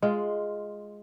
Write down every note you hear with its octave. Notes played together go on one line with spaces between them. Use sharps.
G#3 F4